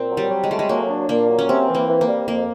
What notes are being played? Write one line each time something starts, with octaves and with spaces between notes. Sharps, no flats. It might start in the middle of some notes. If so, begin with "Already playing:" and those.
Already playing: A#2 C4
F#3
G3
F#3
G#3
G3 A3
G#3
F#3 A#3
D4
A#2 A#3
F#3
C#4
C3 C4
E3
A#3
E3
A#3
G3
F2 A#3